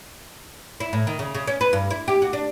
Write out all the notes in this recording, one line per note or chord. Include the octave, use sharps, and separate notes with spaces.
E4
A2
D#3
C#3
C#3
C#4
B4
G2
E4
G4
F#4
D4